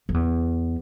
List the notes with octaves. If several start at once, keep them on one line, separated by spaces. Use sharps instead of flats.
F2
E2